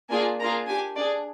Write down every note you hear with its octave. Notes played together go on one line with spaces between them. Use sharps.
A#3 D4 F4 G#4 G#5
A#3 D4 F4 G#4 A#5
D4 G4 G#5
D4 G#4 D5